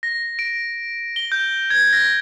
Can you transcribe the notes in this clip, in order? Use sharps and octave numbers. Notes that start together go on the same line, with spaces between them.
A#6
D7
G7
G6
G#6
A#6